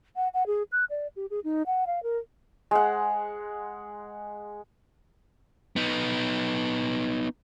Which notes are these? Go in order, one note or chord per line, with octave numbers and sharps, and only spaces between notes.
F#5
F#5
G#4
F#6
D5
G4
G#4
D#4
F#5
F5
A#4
G#3 F#5
B3 D#4